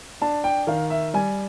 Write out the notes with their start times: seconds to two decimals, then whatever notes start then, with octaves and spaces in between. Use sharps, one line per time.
0.22 D4 A5
0.44 G5
0.67 D#3 F5
0.90 E5
1.14 G3 G#5